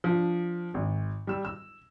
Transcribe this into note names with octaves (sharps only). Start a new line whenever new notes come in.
F3 D4
G#1
G3 E6
E6